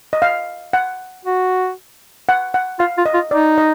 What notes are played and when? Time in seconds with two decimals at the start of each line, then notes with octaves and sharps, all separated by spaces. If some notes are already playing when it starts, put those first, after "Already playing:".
0.13 D#5
0.22 F5
0.73 F#5
1.25 F#4
2.29 F#5
2.54 F#5
2.79 F4 F5
2.98 F4
3.06 D#5
3.14 F4
3.31 D#4 D5
3.58 D#5